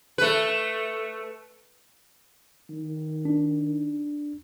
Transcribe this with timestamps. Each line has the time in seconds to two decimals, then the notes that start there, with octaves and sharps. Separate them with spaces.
0.18 A3 B4
2.70 D#3
3.25 D4